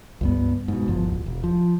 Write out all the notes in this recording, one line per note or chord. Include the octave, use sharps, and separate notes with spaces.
C#2 G2 B3
G#2 B2
G1 E2 F3
D1
E1
F3